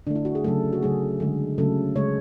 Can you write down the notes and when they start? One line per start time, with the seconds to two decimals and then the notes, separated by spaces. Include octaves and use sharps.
0.07 D3 A3 D4
0.15 E4
0.25 F#4
0.35 G#4
0.44 C#3 F#3 A3 A4
0.73 F#4
0.82 C#3 F#3 A3 G#4
1.20 D3 G#3
1.58 C#3 F#3 A3 A4
1.96 C#3 G#3 C#5